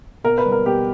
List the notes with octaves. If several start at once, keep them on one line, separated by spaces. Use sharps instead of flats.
B2 A#4
B4
G3
A#4
B2 G4